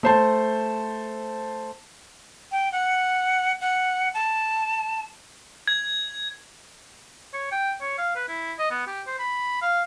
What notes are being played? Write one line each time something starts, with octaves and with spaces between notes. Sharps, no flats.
A3 C5 A5
G5
F#5
F#5
A5
G#6
C#5
G5
C#5
F5
B4
E4
D#5
B3
G4
C5
B5
F5